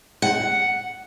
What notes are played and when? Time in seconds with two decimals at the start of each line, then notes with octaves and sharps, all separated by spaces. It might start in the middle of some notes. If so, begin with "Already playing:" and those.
0.22 F#5